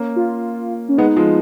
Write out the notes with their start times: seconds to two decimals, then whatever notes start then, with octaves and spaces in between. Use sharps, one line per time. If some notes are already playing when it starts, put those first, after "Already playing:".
Already playing: A#3 C#4
0.16 F4
0.89 C#4
0.98 G#3 B3 D#4
1.16 F3 G#3